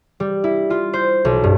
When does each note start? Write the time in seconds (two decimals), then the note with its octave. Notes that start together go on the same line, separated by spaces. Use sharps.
0.20 G3
0.44 E4
0.70 F4
0.93 C5
1.25 B1
1.44 G2